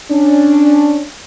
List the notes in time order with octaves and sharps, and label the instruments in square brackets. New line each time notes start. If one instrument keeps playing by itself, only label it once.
[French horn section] C#4 D4